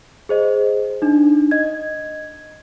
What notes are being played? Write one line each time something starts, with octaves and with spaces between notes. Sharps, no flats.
G#4 C5 D#5
D4 D#4
D#5 G#6